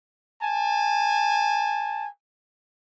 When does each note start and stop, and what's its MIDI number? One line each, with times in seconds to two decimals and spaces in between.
0.42 2.08 80
0.42 2.08 81